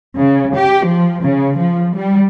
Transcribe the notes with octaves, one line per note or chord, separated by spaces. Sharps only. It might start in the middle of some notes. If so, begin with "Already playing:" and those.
C#3
G4
F3
C#3
F3
G3